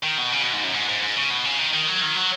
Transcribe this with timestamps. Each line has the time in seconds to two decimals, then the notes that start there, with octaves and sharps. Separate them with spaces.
0.03 D#3
0.18 B2
0.32 C#3
0.42 B2
0.53 G#2
0.64 F#2
0.74 G#2
0.89 G#2
1.02 G#2
1.17 C#3
1.30 B2
1.45 C#3
1.59 D#3
1.73 D#3
1.87 F#3
2.01 D#3
2.16 F#3